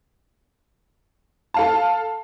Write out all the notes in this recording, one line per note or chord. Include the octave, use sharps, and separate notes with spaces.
A4 F5 A5